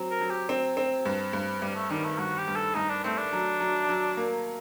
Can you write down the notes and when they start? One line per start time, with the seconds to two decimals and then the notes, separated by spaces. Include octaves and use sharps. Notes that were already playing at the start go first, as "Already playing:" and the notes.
Already playing: F#3 C4
0.11 A#4
0.21 F#3
0.30 G4
0.49 C4
0.77 C4
1.05 G2
1.33 G2
1.62 G2 G3
1.76 A3
1.90 D#3 G3
2.04 A3
2.19 G2 F#4
2.38 G4
2.48 G2
2.56 A4
2.75 G2 D#4
2.90 D4
3.04 A3 C4
3.17 D4
3.33 F#3
3.60 F#3
3.89 F#3
4.17 A#3